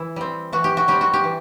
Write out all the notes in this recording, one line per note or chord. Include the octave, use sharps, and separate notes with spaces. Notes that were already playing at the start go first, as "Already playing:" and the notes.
Already playing: E3 E4
G3 C4
E3 F#4
G4
F#4
G3 C4 G4
F#4
G4
E3